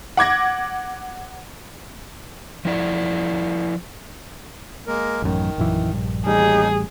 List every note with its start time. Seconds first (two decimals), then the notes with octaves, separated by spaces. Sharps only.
0.17 F#5 D6 G#6 A#6
2.65 F3 E4 D5
4.87 G#3 A#3 A#4
5.22 A1 F#2 D#3
5.58 A#1 F#2 E3
5.92 A#1 G2
6.26 A1 D#2 G3 D#4 G#4